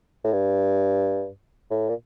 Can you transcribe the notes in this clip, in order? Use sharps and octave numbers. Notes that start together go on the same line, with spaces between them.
A2
G2
A2
A#2